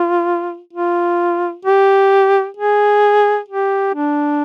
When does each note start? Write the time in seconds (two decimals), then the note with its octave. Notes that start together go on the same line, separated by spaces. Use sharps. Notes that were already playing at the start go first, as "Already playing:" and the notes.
Already playing: F4
0.73 F4
1.65 G4
2.57 G#4
3.48 G4
3.94 D4